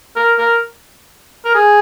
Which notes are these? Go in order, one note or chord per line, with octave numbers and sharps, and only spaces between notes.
A#4
A#4
A#4
G#4